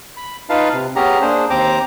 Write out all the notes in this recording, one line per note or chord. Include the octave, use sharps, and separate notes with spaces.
B5
D#4 F4 B4 F5 A5
C3
B3 C#4 G4 G#4 A#5
A#3 D4 G#4 C5
D#2 C4 C5 A#5 D6